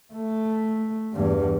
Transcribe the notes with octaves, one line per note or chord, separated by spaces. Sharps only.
A3
E2 G2